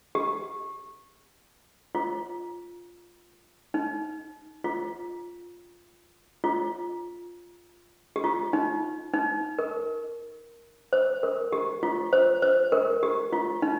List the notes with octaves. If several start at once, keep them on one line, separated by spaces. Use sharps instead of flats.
G4
F4
D#4
F4
F4
G4
F4
D#4
D#4
A#4
C5
A#4
G4
F4
C5
C5
A#4
G4
F4
D#4